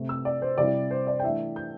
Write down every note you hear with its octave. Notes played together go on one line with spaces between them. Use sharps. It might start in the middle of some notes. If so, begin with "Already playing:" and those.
Already playing: C3 A3 C4
E6
D5
C5
C3 G3 E4 D5
C5
D5
G5
E3 A3 D4 E5
G6